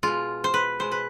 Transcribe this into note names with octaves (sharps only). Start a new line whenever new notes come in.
B2 G#3 F4
C5
B4
B2 G#3 C5
B4